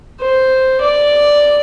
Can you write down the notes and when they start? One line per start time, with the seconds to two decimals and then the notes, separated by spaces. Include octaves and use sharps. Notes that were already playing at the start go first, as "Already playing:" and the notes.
0.20 C5
0.81 D5